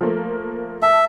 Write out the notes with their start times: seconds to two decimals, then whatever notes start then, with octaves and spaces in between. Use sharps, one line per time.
0.01 F3 A3 A#3
0.82 E5 A5